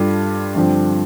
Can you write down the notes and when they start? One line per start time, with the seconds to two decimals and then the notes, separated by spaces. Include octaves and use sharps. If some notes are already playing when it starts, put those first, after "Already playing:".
Already playing: G2 G3 F4 A4
0.55 G2 D3 F3 C4